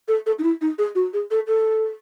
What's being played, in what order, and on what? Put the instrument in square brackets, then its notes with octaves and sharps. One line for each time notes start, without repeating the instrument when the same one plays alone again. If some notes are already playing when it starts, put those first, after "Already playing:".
[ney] A4
A4
D#4
E4
D#4
G#4
F#4
G#4
A4
A4